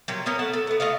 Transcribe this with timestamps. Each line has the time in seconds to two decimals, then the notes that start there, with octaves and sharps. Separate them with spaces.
0.08 A#2 F#3 G3
0.26 A#3 B3 C#4 A#4
0.39 A3 F#5 A5
0.53 A4
0.67 A3 B3
0.80 A3 F4 D#5 F5